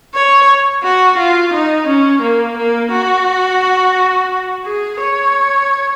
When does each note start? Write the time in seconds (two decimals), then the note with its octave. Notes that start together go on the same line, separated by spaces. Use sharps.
0.14 C#5
0.83 F#4
1.18 F4
1.53 D#4
1.87 C#4
2.22 A#3
2.57 A#3
2.92 F#4
4.65 G#4
5.00 C#5